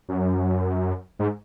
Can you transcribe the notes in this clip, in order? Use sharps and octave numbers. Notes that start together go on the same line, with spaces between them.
F#2
G#2